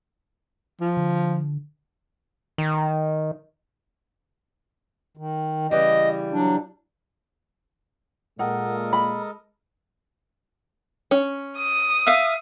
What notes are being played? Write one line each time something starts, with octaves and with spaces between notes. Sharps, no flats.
F3
D3
D#3
D#3
C#3 E3 G3 D#5
F#3 D4
A#2 G#3 A4 A#4 D#5 F#5
B5
C#4
D#6
E5 F5